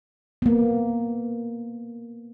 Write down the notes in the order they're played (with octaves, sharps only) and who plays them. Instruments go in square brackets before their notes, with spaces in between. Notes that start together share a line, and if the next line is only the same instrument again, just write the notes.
[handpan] A#3 B3